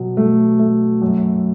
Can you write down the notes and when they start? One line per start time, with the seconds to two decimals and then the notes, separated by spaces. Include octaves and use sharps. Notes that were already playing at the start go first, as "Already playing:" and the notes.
Already playing: B2 F#3
0.17 A3
0.59 A3
1.02 F#2